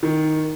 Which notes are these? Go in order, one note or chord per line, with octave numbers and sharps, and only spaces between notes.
D#3